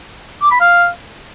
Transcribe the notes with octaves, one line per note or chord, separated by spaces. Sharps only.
D6
B5
F5